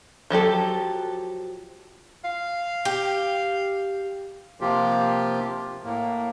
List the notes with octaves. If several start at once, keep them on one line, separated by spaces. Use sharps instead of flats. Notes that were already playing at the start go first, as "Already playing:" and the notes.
F3 F#3 G4 A4
F5
G4
C3 F3 A#3 F4 G4
A2 A#3